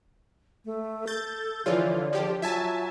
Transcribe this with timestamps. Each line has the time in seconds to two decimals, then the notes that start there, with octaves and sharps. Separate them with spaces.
0.65 A3
1.07 A4 G6 A6
1.66 D3 E3 F3 F4 G#4 C#5 D5
2.13 F3 G4
2.42 F#3 F4 E5 G#5 A5